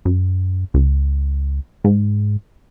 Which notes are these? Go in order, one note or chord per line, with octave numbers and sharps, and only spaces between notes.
F#2
C#2
G#2